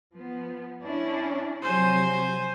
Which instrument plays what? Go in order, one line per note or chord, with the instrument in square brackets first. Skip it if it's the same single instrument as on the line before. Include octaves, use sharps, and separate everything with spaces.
[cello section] F3 B3
C#4 D4 E4
[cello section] C3 F3 F#3 [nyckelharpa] C5 G#5